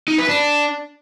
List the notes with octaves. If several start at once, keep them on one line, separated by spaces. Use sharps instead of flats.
D#4
B4
D4